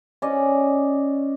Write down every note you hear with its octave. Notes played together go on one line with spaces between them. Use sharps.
C#4 D5 D#5